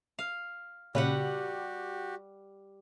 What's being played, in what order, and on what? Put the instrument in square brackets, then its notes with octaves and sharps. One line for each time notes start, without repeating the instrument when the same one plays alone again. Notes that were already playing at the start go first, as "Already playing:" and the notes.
[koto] F5
[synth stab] A#2 C#3 [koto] G3 B4 F#5 [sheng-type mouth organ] F#4 G4